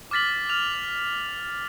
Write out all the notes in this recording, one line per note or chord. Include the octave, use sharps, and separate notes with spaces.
D6 F6 A6 B6 F#7
F6 F7